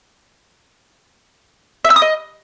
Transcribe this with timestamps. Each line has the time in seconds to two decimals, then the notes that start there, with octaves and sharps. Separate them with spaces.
1.85 E5
1.90 E6
1.96 D#6
2.02 D#5